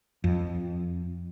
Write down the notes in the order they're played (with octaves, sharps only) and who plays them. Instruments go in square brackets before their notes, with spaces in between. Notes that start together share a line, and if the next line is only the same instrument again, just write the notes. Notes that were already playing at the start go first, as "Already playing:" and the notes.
[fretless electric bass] F2